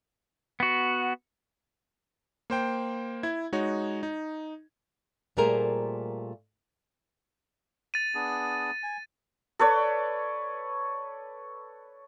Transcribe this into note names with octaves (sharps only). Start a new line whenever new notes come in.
B3 F#4
A#3 C5 G5
E4 G#6
G#3 D#4 F#4 C#5
D#4
A#2 G3 A3 G#4 A#4 C5
A6 D#7
B3 D4 G#4
G#5
A4 B4 C#5 D5